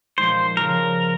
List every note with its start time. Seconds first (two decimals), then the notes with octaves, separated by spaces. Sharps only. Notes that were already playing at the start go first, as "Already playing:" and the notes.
0.18 A#2 F3 G#3 D#4 C5
0.57 C#3 F3 C4 G4 A#4